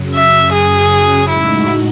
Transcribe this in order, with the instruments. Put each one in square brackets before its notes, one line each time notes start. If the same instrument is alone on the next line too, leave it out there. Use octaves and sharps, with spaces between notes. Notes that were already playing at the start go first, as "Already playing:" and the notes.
Already playing: [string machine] F#2 C#3 F#3
[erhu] E5
G#4
[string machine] A2 G#3 D#4 F#4 [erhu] E4